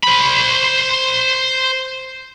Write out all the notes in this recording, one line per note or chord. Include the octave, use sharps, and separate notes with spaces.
C5 B5